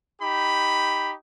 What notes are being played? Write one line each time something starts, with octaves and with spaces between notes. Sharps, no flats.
D#4 G4 B5